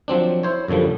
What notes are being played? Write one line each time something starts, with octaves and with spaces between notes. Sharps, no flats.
F3 F#3 C4 D4
E4 C5 C#5
F#2 A#2 D3 F3 G3